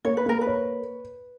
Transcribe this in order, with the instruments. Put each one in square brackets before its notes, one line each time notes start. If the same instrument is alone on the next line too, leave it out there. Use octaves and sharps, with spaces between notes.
[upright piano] A#3 [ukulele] C#5
[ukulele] B4
[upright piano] A#3 [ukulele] A#4
[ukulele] B4
[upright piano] C#5